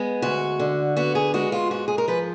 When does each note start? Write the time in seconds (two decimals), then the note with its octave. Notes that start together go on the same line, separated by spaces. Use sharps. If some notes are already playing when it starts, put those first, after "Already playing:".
Already playing: G#3 B3
0.22 D2 F#4
0.60 D3
0.97 B3 F#4
1.15 G#4
1.34 G#3 F#4
1.52 F4
1.71 G#2 F#4
1.88 G#4
1.98 A#4
2.08 F3 B4